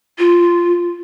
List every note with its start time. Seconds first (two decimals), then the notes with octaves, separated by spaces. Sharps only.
0.19 F4